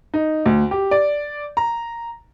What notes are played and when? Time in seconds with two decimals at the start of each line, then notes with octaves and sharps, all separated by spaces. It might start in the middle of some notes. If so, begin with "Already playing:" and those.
0.14 D#4
0.46 D2
0.71 G4
0.91 D5
1.57 A#5